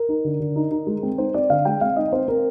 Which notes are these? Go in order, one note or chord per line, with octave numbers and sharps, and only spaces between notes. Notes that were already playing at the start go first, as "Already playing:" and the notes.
Already playing: A#4
D#4
D3
D3
D#4
D#4
G#3
C4
D#4 C5
C4 D5
D3 F5
G#3 G5
C4 F5
D#4 D#5
C4 C5
C4 A#4